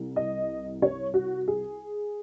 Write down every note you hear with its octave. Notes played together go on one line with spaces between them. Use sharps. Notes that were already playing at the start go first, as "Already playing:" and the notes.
Already playing: C2 C3
D#5
C#5
F#4
G#4